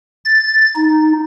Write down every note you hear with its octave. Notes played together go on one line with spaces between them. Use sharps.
A6
D#4